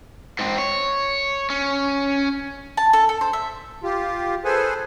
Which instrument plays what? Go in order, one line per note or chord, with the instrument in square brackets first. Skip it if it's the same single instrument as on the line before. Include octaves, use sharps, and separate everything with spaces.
[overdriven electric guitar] G#2 C4
C#5
C#4
[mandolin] A5
A4
A4
C5
E5
[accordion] F4 G4
G#4 A4 B4 C5 G#5